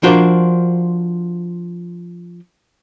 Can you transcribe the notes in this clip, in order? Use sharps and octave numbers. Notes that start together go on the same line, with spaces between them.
F3 D4 F4 F#4 A#4 C5